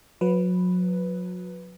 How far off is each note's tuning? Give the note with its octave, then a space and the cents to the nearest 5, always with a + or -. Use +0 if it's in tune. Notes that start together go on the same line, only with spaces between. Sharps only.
F#3 -35 B4 +0